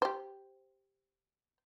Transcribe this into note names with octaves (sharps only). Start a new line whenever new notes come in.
G4 C5